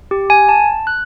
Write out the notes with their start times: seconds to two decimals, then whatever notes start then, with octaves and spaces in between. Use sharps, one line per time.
0.11 G4
0.30 G#5
0.49 A5
0.87 F#6